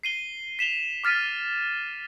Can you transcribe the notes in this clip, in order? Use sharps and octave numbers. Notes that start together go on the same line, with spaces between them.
C7 D#7 G7
B6 E7 F7 G7
D6 F6 A6 B6 D#7